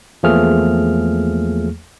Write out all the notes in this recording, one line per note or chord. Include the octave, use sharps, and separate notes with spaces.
E2 F3 A3 A#3 G#4 F6